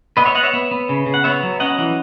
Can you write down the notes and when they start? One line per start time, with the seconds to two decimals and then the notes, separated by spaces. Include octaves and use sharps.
0.17 B3 B4 D#5
0.26 C#5 E5
0.35 B3 D#5 F#5
0.43 C#5 E5
0.53 B3
0.71 B3
0.89 C#3
1.06 C#3
1.14 F#5
1.24 B3 C#5 E5
1.43 F#3
1.60 C#4 D#5 F#5
1.78 E3